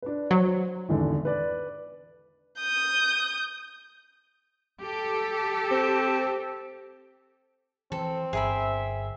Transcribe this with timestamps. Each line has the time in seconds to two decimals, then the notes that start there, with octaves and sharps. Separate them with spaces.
0.02 D4 B4
0.31 F#3 C5
0.89 G#1 E2 D3
1.25 B4 D5
2.60 D#6 G6
4.81 G4 A4
5.72 C4
7.92 E3 C4 A4
8.33 G1 G#4 A#4 E5 B5